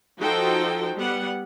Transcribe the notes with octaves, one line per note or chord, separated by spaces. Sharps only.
F3 D#4 F#4 A4 C5 G5
G3 B3 F#5